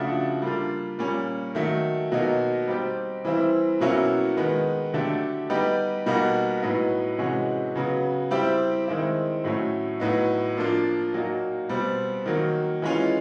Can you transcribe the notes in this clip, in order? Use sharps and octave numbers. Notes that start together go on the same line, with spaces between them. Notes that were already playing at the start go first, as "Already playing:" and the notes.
Already playing: C#3 F3 A3 D4 F#4
G3 A#3 D4 F4
A#2 G3 A#3 C#4
D#3 F#3 A3
B2 F#3 A#3 D#4
G3 C4 D#4 G4
E3 G3 C4 E4
B2 F#3 A#3 C#4 E4
D#3 G#3 B3
D3 F#3 A3 D4 G4
G3 B3 D#4 G4
B2 G3 A#3 D#4 F#4
A2 F#3 B3 D#4
C3 E3 G#3 C#4 F#4
C#3 F#3 B3
G3 C4 E4 G4
D#3 G#3 C4 E4
A2 F#3 A3 C#4
A2 F#3 B3 D#4
F3 A#3 D4 F4
A#2 F#3 A#3 D#4
B2 G3 C4
D#3 F#3 A#3
E3 G#3 C#4 F4